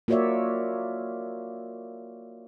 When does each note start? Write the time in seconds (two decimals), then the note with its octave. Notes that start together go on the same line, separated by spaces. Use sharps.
0.08 A#3 F4 F#4 C#5 D5 E5